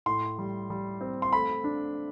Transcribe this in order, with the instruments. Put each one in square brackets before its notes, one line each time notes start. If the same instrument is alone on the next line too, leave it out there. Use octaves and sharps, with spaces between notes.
[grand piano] A2 C6
G3
G3
C4
C6
A3 B5
D4